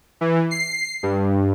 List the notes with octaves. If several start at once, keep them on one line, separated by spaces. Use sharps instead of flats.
E3
C7
G2